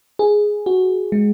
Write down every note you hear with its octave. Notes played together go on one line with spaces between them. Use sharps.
G#4
F#4
G#3